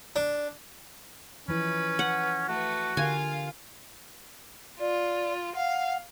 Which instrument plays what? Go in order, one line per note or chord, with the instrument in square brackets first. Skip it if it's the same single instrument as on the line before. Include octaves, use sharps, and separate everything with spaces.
[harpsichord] D4
[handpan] E3 F3 E4 [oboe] C#4 [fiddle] B4
[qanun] F#5
[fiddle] A3 B4 [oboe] F#4
[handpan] D3 G4 A#4 [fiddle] F4 F5 [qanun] G#5
[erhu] F4 [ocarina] D5
[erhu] F5 [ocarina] F#5